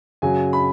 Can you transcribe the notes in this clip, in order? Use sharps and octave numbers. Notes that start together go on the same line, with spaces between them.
F#2 C#3 F#3 G#5
B5